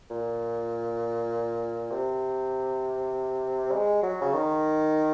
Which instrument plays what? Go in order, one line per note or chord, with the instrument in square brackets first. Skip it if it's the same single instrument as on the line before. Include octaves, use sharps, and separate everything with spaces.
[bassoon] A#2
C3
G#3
F#3
C#3
D#3